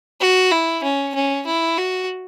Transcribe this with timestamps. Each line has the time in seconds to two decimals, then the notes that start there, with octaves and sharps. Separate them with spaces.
0.21 F#4
0.51 E4
0.83 C#4
1.15 C#4
1.46 E4
1.77 F#4